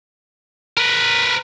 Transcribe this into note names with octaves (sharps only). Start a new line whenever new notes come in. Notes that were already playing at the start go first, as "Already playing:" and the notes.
A#4 B4